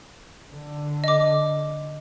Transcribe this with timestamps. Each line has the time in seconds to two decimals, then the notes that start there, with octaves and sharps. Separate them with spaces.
0.52 D3
1.04 D#5 D6